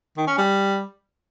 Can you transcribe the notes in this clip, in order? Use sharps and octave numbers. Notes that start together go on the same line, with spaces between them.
D#3
C#4
G3